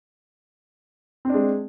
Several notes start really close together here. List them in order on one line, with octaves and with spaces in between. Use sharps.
C4 D4 G#3